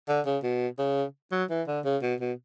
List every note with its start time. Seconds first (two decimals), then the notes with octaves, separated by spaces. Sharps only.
0.08 D3
0.26 C#3
0.43 B2
0.79 C#3
1.32 F#3
1.50 E3
1.68 D3
1.85 C#3
2.02 B2
2.20 B2